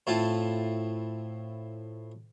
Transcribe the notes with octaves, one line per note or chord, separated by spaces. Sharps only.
A2 C4 E4 F4 A5